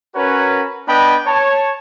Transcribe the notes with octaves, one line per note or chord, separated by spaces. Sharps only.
C#4 F#4 A#4 B4 C#5
B3 D4 B4 D#5 G5 B5
C#5 A5